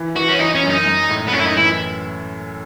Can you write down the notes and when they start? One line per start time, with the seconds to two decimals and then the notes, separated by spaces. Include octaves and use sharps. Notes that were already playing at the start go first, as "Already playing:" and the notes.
Already playing: E3
0.16 E3 F#4
0.29 C#4
0.40 E3 D#4
0.55 C#4
0.63 F#2
0.70 D#4
0.86 G#3
1.09 A2
1.27 B3
1.33 F#2 C#4
1.40 E4
1.45 D#4
1.57 E3 E4